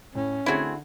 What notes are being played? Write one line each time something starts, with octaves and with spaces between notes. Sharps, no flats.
A2 C#4
D3 A3 C4 E4 F#4 G#4